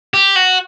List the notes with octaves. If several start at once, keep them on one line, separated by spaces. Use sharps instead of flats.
G4
F#4